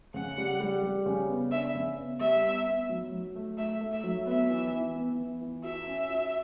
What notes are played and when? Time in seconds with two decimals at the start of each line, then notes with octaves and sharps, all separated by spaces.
0.14 C#3 F#5
0.38 G3
0.60 G3
0.83 G3
1.06 C#3
1.29 B3
1.51 D4 E5
1.75 C#3
1.97 B3
2.20 G3 E5
2.43 B3
2.66 B3
2.89 F#3
3.12 F#3
3.35 A3
3.57 A3 E5
3.81 A3
3.92 E5
4.04 F#3
4.26 B3 E5
4.50 E3
4.72 E3
4.95 B3
5.18 E3
5.41 E3
5.64 F#4 E5
5.87 C#4
6.10 F#4